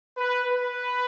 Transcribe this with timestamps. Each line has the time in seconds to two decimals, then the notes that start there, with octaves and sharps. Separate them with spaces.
0.17 B4
0.52 B4